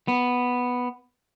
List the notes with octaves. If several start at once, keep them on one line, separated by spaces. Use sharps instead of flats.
B3